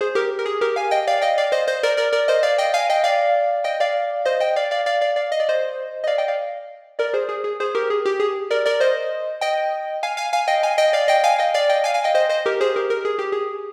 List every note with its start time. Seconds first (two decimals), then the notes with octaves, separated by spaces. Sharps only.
0.01 G#4 C5
0.15 G4 A#4
0.39 A#4
0.46 G#4
0.61 G4 A#4
0.76 F5 G#5
0.91 D#5 G5
1.07 D5 F5
1.21 D#5 G5
1.38 D5 F5
1.52 C5 D#5
1.68 C5 D#5
1.83 A#4 D5
1.97 A#4 D5
2.13 A#4 D5
2.28 C5 D#5
2.43 D5 F5
2.58 D#5 G5
2.74 F5 G#5
2.90 D#5 G5
3.04 D5 F5
3.64 D#5 G5
3.80 D5 F5
4.25 C5 D#5
4.40 D#5 G5
4.56 D5 F5
4.71 D5 F5
4.86 D5 F5
5.01 D5 F5
5.16 D5 F5
5.32 D#5
5.40 D5
5.49 C5 D#5
6.04 D#5
6.07 D5 F5
6.18 D#5 G5
6.28 D5 F5
6.99 A#4 D5
7.14 G#4 C5
7.29 G#4
7.44 G#4
7.60 G#4 C5
7.75 G4 A#4
7.90 G#4
8.05 G4
8.20 G#4
8.51 A#4 D5
8.66 A#4 D5
8.80 C5 D#5
9.41 D#5 G5
10.03 F5 G#5
10.17 F5 G#5
10.33 F5 G#5
10.47 D#5 G5
10.63 F5 G#5
10.78 D#5 G5
10.93 D5 F5
11.08 D#5 G5
11.24 F5 G#5
11.39 D#5 G5
11.54 D5 F5
11.69 D#5 G5
11.84 F5 G#5
11.94 F5 G#5
12.04 D#5 G5
12.15 C5 D#5
12.29 C5 D#5
12.46 G4 A#4
12.61 G#4 C5
12.76 G4 A#4
12.90 A#4
13.05 G#4
13.19 G4
13.32 G#4